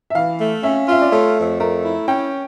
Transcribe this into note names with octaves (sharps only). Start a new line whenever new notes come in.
E5
E3 F5
A3
C#4 E5
F4 E5
D5
A3 C#5
F2
A3 A#4
E4
C#4 G5